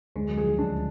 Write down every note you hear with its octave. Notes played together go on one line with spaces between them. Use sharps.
D2 D3 G#3
F#3
F3 G#4
D3
C#2 C#3 D4